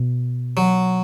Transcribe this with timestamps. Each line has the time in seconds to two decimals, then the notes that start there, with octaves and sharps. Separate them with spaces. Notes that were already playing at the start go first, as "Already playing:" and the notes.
Already playing: B2
0.57 F#3